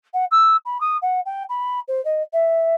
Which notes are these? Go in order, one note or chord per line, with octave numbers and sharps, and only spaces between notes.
F#5
E6
B5
D#6
F#5
G5
B5
C5
D#5
E5